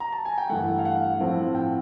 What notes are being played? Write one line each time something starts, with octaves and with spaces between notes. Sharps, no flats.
A#5
A5
G#5
G5
G2 E3 A3 F#5
F5
F#5
A2 F3 A3 C4
G5